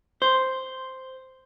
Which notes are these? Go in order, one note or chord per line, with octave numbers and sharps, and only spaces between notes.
C5